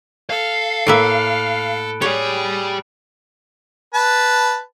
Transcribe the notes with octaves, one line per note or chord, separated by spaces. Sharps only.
A4 F5
A2 A#3 E5 B5 F#6 D7
G4 G#4 C#5 D5
B4 A5